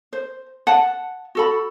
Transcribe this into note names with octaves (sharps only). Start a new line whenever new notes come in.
C5
F#5 A5
F#4 A4 B5